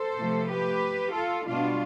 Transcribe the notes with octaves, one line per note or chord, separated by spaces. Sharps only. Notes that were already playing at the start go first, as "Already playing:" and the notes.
Already playing: A4 C5
C3 F3 A3
G4 B4
F4 A4
B2 G3 D4 F4